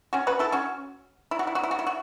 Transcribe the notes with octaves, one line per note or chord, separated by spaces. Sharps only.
C#4 F#4
F#4 B4
E4 A4
C#4 F#4
E4
F#4
E4
F#4
E4
F#4
E4
F#4